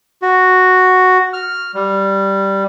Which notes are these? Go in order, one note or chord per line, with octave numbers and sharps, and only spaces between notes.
F#4
F6
G3